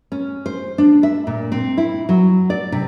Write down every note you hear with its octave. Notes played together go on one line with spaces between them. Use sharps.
C#4
C5
D4
E5
A#2
C4
E4
F#3
D5
C3